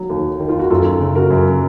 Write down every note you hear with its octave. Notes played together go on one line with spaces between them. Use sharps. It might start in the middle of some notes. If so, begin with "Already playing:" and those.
Already playing: D#3 F#3 A#3
D#2
D#3
F4
F#4
F#2 F4 A4
C#3
F#4 A#4
F#2